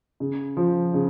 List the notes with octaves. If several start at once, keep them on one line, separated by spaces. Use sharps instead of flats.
C#3
F3
C#3